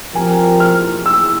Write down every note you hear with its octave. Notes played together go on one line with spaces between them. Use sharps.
F3 C4 G4 A#4 G#5
F6
E6